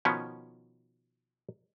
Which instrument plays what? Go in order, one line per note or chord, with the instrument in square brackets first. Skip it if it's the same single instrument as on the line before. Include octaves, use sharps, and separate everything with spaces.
[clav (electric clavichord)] B2 D#3 F3 B3 C#4